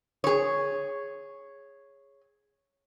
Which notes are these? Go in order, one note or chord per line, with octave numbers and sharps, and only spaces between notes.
G#4 C#5